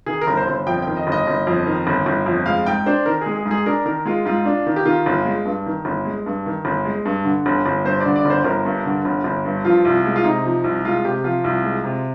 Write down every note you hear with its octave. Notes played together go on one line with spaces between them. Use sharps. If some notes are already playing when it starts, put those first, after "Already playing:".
D#3 G#4
A#4
G1
C5
G1
F2 G5
D#3 G5
D#5
G1 D#5
G1
F2
D#3
G1
G1
F2
G#3 F5
G#2 G5
D4 C5
D#3 A#4
G#3 G#4
G#4
G#2
G#4
D4 A#4
D#3 A#4
G#3 F4
G#2 F4
D4
D#3
G4
D#3 F4
G1
G#3
G2
D#3
G1
G#3
G2
D#3
G1
G#3
G2
D3
G1
G1
G2 C5
D5
D3
D5
G1 C5
G1 A#4
G2
D3
G1
G1
G2
F3 F4
C2
G#3
F4
C3 D#4
F3
C2
G#3 F4
C3 G4
F3 F4
C2
G#3
C3